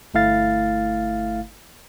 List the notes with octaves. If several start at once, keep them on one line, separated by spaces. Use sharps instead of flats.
G1 A3 E4 F5 A6